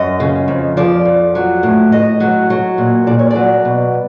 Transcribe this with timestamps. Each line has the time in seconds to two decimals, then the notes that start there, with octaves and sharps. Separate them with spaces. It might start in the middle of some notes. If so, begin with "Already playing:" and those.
Already playing: F#2 D#5
0.20 C#3
0.48 F2
0.77 F3 D5
1.05 F2
1.35 F#3
1.63 A2
1.92 A2 D#5
2.20 F#3
2.50 F#3
2.78 A#2
3.07 A#2 D5
3.19 C#5
3.30 D5
3.36 F#3
3.65 B2